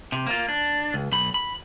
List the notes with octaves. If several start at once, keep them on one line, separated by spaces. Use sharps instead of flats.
C3
A#3 F4
D4
C#2
B1 B5
B5